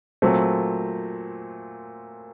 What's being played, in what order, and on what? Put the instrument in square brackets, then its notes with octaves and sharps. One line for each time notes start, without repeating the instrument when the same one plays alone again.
[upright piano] A#2 F#3 A3 C4